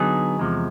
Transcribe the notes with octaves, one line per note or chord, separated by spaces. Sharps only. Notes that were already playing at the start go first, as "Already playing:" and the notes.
Already playing: D3 F#3 B3 D#4 G#4
E2 C3 F3 G#3